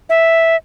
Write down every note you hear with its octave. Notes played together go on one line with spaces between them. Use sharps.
E5